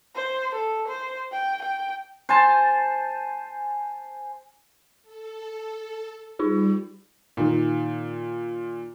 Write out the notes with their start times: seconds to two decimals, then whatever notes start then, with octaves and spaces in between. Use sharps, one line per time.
0.16 C5
0.55 A4
0.88 C5
1.33 G5
1.63 G5
2.29 C5 G#5 A5
5.03 A4
6.39 G3 D#4 F4 G#4
7.37 A#2 D#3